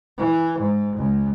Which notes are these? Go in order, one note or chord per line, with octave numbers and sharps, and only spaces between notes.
E3
G#2
C#2